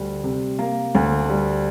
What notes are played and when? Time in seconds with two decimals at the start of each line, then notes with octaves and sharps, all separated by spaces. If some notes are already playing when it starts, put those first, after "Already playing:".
Already playing: D2 G3
0.24 C3
0.59 A#3
0.95 D2
1.30 G3